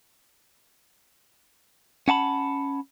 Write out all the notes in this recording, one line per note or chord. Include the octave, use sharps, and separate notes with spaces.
C#4 F#5 A5 B5